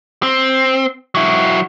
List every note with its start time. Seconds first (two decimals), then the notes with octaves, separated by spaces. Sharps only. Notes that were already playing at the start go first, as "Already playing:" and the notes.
0.23 C4
1.15 F#3 E4